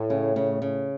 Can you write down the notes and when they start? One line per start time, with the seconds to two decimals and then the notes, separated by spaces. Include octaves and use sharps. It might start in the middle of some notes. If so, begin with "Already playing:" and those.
Already playing: A2
0.10 C#3
0.36 C#3
0.62 C#3